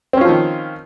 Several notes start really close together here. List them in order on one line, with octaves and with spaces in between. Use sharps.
C4 C#4 F4 F3 D#3